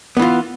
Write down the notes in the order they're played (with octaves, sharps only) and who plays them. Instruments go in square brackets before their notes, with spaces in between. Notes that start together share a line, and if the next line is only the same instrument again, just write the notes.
[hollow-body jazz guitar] B3
E3
F4